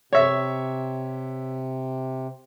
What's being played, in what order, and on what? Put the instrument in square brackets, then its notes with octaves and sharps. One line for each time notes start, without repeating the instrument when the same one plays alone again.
[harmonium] C3 [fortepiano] C#5 E5